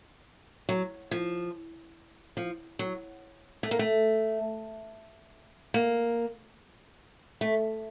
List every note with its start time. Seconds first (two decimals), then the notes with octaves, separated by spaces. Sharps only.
0.69 F#3
1.11 F3
2.37 F3
2.79 F#3
3.63 A3
3.71 A#3
3.79 A3
5.74 A#3
7.41 A3